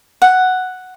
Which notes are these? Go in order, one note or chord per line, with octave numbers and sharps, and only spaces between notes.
F#5